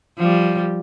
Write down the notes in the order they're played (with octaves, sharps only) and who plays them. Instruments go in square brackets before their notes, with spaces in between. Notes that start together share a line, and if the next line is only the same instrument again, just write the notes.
[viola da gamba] F3 G3